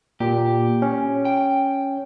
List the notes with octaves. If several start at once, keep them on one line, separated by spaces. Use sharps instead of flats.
A#2 G4
C#4
G5